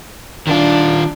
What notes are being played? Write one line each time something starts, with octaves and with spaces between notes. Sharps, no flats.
D#3 D4 F4